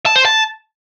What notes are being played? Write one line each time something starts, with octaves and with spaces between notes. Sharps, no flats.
A5
C5
A5